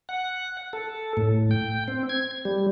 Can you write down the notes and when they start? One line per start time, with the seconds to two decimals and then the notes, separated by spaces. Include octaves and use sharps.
0.09 F#5
0.73 A4
1.17 A2
1.51 G5
1.88 C4
2.09 G#6
2.45 G3